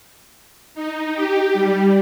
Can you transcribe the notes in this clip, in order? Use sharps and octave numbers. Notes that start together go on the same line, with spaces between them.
D#4
G4
G3